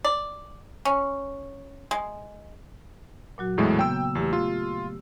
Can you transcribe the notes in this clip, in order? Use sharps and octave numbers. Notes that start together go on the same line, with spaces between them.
D5
C#4
G#3
A#2 F#3 F#4
E2 A2 G#3
C#3 A#3 B3 G5 E6
E2 A3 G4
F4